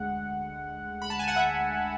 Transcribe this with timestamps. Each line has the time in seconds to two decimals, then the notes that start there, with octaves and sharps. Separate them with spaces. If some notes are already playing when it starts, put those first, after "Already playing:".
Already playing: D2 D3 G#3 F#5
1.02 B5
1.10 A5
1.19 G#5
1.28 F#5
1.36 E5